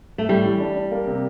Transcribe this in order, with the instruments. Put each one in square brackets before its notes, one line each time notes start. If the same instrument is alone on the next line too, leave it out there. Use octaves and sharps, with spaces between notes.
[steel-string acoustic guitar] A3
[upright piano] A2 [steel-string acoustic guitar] G3
[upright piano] E3
D4
D4
A#3
C3